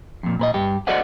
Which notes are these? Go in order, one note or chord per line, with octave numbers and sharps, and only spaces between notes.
F2 A#2
A#2 B4 D#5
G2 G4
F#4 A4 C5 D5 D#5 F#5